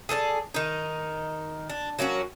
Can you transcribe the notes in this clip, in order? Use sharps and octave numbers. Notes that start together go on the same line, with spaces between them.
G#4 A4 B4 D5
D#3 D#4
D4
F#3 A#3 C#4 F#4